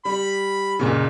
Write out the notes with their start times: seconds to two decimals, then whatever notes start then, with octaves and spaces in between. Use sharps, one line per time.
0.05 G3 B5
0.79 F#1 A#2 C#3